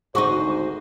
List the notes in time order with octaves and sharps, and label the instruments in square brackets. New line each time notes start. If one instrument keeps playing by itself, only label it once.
[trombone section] G#1 D2 C5 [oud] D#4 F#4 [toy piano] G#4 C#6